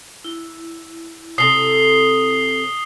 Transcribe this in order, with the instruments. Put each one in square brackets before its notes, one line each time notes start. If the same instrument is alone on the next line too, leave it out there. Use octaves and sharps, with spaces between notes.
[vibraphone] E4
[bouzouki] C3 A4 [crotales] D#6 C7 G7